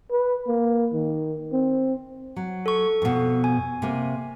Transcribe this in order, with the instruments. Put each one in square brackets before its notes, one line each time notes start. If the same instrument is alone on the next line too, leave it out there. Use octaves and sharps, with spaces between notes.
[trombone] B4
A#3
D#3
C4
[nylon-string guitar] F#3
[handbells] A4 C#6
[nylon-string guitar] F2 B2
[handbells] G#5
[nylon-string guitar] C3 A#3